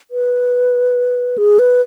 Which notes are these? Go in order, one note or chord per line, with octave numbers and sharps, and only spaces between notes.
B4
G#4
B4